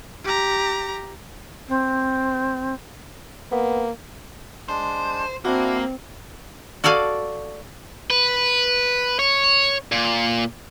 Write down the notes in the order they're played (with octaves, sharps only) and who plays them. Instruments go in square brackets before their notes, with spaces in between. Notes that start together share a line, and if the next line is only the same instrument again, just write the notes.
[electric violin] G4 A#5
[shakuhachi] C4
[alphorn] A#3 [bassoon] B3
[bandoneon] G#3 D4 [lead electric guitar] C5
[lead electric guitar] A#3 [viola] C4 [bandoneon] D4 E4 [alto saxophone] F#4
[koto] F#4 A4 D5 F5 G#5
[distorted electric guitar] B4
C#5
A#2